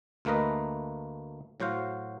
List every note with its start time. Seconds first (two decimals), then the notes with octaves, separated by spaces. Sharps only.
0.25 D2 A3 A#3 A#4 B4 D#5
1.60 A2 F#3 F#4 C5 F5